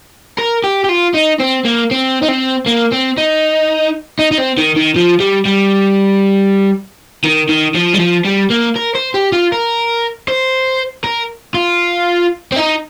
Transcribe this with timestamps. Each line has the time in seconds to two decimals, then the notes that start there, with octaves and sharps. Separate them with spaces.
0.39 A#4
0.64 G4
0.84 G4
0.89 F4
1.14 D#4
1.40 C4
1.65 A#3
1.91 C4
2.22 D#4
2.28 C4
2.67 A#3
2.93 C4
3.18 D#4
4.19 D#4
4.31 D#4
4.38 C4
4.57 D#3
4.76 D#3
4.96 F3
5.20 G3
5.45 G3
7.24 D#3
7.49 D#3
7.75 F3
7.94 G3
8.00 F3
8.25 G3
8.50 A#3
8.76 A#4
8.95 C5
9.14 G4
9.32 F4
9.52 A#4
10.28 C5
11.04 A#4
11.54 F4
12.52 C4
12.56 D#4